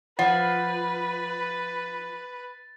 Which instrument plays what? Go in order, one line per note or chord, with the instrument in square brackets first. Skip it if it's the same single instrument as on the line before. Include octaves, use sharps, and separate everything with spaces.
[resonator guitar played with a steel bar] F3 [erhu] B4 [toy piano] F#5 [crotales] A6